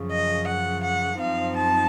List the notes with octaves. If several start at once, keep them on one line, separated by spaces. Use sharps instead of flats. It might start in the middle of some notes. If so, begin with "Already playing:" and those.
Already playing: F#2 C#3 F3
D#5
F#5
F#5
F#2 F3 C4 D#4 F5
A5